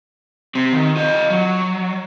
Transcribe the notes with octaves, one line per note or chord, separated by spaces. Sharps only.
C4 G4
D#3
F4 D#5
F#3